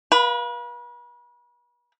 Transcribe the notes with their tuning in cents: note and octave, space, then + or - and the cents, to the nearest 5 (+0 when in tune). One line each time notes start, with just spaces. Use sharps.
B4 -40 F5 +0 B5 +10